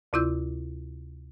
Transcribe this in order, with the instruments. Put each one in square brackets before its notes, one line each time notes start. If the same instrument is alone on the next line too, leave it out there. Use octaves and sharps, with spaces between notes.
[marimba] D2 C3 E4 F4 E6 G6